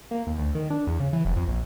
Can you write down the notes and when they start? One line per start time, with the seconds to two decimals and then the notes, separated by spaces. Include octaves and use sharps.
0.11 A#3
0.27 D#2
0.38 D2
0.55 D#3
0.70 D4
0.87 E2
1.00 C#3
1.13 E3
1.25 F1
1.36 F2
1.48 A#1